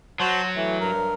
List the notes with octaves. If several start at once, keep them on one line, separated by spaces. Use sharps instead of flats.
F#3 F#4 C5 A5
E3 A3
G2 A#4